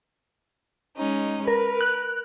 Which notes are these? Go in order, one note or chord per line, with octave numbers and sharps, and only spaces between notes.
G#3 C#4 D#4
A#4 B4
F#6